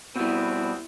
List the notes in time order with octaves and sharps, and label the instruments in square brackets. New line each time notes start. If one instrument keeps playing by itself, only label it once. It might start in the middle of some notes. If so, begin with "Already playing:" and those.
[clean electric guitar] B2 G3 [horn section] B3 C4 [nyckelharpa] E4